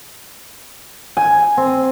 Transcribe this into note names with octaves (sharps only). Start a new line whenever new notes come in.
G#5
C4